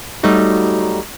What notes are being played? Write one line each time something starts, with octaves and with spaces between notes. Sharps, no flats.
F#3 G3 A3 D#4 F#4